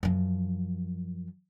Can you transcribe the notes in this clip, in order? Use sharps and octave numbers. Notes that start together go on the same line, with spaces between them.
F#2 F3